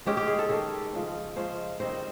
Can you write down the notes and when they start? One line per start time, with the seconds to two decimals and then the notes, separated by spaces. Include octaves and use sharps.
0.06 D#3 G#3 C#4 G4
0.17 G4
0.28 G#4
0.39 A4
0.49 D#3 G#3 C#4 A4
0.93 C#3 F3 G#3 C#4
1.36 C#3 F3 G#3 C#4 C5
1.80 D#3 G3 C4 D#4 C5